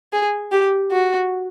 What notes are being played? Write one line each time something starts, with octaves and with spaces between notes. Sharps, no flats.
G#4
G4
F#4